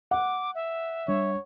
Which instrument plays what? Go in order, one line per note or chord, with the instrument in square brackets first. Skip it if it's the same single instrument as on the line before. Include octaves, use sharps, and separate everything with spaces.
[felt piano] F#5 [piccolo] D6
[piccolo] E5
[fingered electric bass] G3 D4 [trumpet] C#5